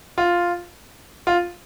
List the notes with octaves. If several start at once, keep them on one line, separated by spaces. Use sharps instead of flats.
F4
F4